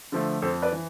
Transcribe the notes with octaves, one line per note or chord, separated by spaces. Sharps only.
D3 F3 A3
F2 A4 C5
B4 D5
E3